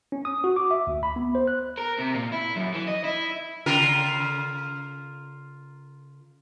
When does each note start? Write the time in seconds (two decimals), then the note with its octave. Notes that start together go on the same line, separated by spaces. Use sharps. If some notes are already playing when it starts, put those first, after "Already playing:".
0.12 C#4
0.25 D#6
0.44 F#4
0.56 D6
0.71 E5
0.87 D2
1.03 B5
1.16 B3
1.35 C5
1.47 F#6
1.78 A#4
1.99 C3
2.15 A#2
2.33 E4
2.56 F#2
2.74 E3
2.87 D#5
3.04 E4
3.66 C#3 F4 A#4